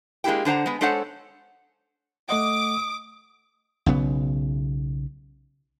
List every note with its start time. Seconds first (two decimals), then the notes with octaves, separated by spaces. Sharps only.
0.24 G#3 A#3 D4 E4 G4 G5
0.45 D3 D4 C5 F#5 A#5
0.66 G#3 B3
0.81 G#3 D4 A4 C5 C#5 F#5
2.29 A3 D#5 F#5 D6 D#6
3.86 B1 C#3 B3